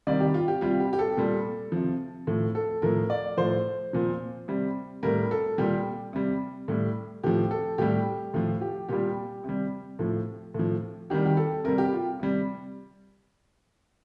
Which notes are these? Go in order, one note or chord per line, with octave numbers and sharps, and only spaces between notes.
C3 D#3 G3 D5
G4
F4
G4
C3 G3 F4
G4
G4
A4
A#2 G3
C3 F3
A2 F3
A4
A2 F3 A#4
D5
A2 F3 C5
A#2 F3
C3 G3
A2 G3 A#4
A4
A#2 G3 G4
C3 G3
A2 G3
A2 F3 G4
A4
A2 G3 G4
A2 F3 F4
G4
A#2 G3 G4
C3 G3
A2 F3
A2 F3
C3 D#3 G3 G4
G4
A4
C3 G3 A#4
G4
F4
C3 G3